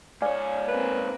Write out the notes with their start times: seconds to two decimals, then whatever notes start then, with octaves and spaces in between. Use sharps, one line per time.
0.22 G#2 C#5 D5 F5 G#5
0.68 A#3 C4 B4